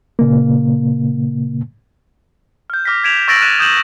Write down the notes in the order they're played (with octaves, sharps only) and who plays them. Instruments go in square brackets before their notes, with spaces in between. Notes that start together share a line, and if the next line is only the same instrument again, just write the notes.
[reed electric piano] A#2 C#3 A#3
[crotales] F6 G6
D6 F6 A#6 B6
G#6 B6 D7 E7 F7
C#6 E6 A6 A#6 D7 F#7
F#6 A6 D#7 E7
D#6 G6 E7 F#7